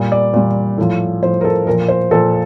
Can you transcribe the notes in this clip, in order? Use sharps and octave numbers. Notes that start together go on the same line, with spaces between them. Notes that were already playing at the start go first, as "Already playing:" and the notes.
Already playing: A#2 G3
D5
A#2 G3
A2 F3
A2 F3 C5
A#4
A4
A#2 F3 A#4
C5
A#2 F3 A4